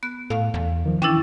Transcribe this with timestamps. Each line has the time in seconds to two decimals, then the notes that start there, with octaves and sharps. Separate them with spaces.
0.03 B3 F#6
0.30 A2 A4 F5
0.54 E2
0.85 D#3 F3
1.02 E3 C#4 D4 E4 G5 D6 A6